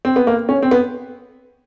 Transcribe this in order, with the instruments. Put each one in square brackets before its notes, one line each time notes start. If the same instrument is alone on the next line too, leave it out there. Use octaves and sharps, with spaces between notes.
[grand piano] C4
B3
A#3
C#4
C4
B3